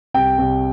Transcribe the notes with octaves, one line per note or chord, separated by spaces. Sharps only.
C2 G5
C2